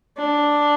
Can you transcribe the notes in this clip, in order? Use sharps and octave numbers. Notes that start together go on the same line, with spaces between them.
D4